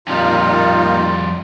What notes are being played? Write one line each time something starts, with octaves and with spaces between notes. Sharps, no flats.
F2 A#2 G3 D#4 F4 C6